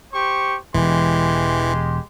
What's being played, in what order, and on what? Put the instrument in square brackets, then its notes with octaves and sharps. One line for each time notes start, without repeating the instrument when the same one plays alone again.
[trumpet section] G4 C5 C#6
[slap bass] E1 [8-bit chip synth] E3 [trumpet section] G#3 G4 C6